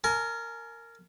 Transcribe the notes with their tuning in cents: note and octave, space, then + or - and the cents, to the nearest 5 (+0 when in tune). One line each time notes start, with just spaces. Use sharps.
A#4 -15 G#5 +30